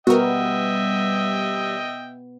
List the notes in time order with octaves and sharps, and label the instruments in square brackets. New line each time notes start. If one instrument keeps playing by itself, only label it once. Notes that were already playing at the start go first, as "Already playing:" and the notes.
[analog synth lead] G3 [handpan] B3 [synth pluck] F#4 A#4 [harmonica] D#5 E5 G5